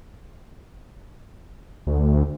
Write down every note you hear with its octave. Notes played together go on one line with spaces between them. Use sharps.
D2